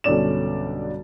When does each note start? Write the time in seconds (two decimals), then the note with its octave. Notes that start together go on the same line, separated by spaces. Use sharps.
0.04 B1 G2 D3 C#4 D5 E7